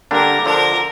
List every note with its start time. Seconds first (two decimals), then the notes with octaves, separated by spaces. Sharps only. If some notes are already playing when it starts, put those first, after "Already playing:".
0.11 D3 G3 A#3 D4 A#4
0.46 D3 F3 D4 A#4